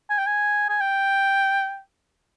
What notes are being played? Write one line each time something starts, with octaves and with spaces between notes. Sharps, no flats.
G#5
G5
G#5
G#5
G5